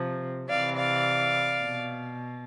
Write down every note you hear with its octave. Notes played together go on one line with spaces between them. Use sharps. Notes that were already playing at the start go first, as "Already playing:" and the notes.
Already playing: C3 F3
C3 E3 D5 F5
D5 F5
B2